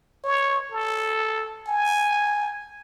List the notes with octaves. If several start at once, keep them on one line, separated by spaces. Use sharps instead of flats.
C#5
A4
G#5